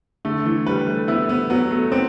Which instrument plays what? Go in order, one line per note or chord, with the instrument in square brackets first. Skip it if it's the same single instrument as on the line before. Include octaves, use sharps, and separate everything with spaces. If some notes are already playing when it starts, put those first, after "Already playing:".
[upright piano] D3 [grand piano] A3
[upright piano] E3
[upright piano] G3 [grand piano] B4
[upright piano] A3
[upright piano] B3 [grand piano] E4
[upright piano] B3
[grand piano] F#3 [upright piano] B3
[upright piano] A3
[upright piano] B3 [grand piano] C4